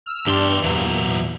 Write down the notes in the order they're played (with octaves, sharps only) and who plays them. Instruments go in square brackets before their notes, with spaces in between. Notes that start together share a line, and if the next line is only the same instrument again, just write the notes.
[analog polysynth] E6 F6
[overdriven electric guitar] E2 C6 [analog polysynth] G2 D4 G4
[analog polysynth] E2 A#2 [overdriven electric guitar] E3 F#3